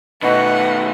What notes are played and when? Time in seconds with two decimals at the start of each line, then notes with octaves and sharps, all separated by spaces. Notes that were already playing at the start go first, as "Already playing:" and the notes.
0.22 B2 D#3 A3 F#4 B4 E5 F#5